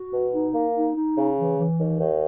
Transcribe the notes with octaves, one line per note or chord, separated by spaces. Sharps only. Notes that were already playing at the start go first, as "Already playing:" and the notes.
Already playing: F#4
B2
D#4
A#3
D#4
D#4
C#3
E3
E3
D#2
D#2